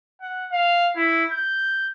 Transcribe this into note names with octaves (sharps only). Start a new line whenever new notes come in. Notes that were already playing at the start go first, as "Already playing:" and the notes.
F#5
F5
E4
G6